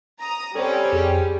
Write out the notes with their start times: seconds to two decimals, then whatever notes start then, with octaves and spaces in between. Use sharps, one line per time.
0.19 A#5 D#6
0.55 G3 C4 C#4 A4 C5
0.92 F2 G4 G#4